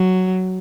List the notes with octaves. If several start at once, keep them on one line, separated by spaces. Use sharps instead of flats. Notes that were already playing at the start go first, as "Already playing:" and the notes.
Already playing: F#3